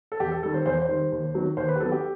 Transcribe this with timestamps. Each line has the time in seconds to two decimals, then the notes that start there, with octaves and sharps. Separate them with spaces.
0.12 A4
0.20 E2 G4
0.32 A4
0.43 D#3 G3 A4
0.54 C5
0.66 E2 C5
0.82 C5
0.89 D#3 G3
1.12 D#2
1.34 D#3 F#3 B3
1.57 D#2 C5
1.69 B4
1.76 G4
1.79 D#3 F#3 B3 A4
1.92 G4